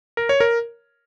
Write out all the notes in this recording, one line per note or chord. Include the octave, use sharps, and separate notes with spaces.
A#4
C#5
A#4